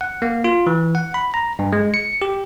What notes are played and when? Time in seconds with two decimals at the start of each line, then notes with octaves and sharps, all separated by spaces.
0.01 F#5
0.22 A#3
0.44 F4
0.67 E3
0.95 F#5
1.14 B5
1.34 A#5
1.59 G2
1.73 G#3
1.94 C#7
2.22 G4